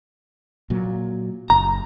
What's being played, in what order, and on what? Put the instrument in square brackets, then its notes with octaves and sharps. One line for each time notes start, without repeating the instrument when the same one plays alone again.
[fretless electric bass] A#2 F#3
[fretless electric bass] F#1 [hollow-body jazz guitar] A#5